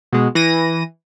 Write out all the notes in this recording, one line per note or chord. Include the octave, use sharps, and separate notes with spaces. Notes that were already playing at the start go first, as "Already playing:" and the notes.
B2 G#3
E3 A#6 D#7